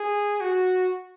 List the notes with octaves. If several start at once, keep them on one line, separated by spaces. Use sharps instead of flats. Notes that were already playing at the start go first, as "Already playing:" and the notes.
Already playing: G#4
F#4